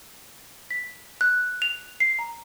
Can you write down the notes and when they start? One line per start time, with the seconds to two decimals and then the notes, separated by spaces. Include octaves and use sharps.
0.71 B6
1.21 F#6
1.62 F7
2.00 C7
2.19 A#5